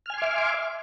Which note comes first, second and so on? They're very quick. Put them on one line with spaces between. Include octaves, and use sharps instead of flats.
F6 G#5 C6 D6 E5